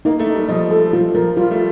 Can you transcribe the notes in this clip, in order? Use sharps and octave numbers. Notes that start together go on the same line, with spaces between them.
A#3 D#4
A3
D#4
G3
F3 D#5
A4
F3 F4
F3 A#4
G3 F4
A3